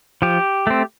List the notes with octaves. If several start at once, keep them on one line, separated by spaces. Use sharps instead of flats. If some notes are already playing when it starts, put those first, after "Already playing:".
F3 G4
A3 C4